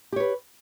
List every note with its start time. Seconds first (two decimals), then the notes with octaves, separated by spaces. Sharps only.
0.12 G4
0.16 C#5
0.20 B4